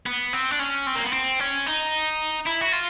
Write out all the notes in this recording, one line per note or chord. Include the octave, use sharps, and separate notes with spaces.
B3
C4
D4
C#4
C4
A#3
B3
C4
C#4
D#4
E4
F#4
F4